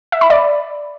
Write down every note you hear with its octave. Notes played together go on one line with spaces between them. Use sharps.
E5
B5
D5